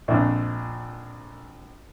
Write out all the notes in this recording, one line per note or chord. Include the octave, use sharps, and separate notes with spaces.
A#1 F2